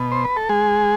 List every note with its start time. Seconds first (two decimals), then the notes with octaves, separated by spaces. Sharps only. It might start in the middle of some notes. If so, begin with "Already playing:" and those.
Already playing: B2
0.12 C5
0.25 B4
0.36 A4
0.49 G#3 G#4